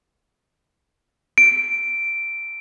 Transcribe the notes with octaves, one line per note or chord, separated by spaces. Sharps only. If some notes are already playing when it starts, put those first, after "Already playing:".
D7